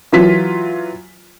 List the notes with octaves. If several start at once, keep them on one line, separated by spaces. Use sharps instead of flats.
E3 F#3 F4 B6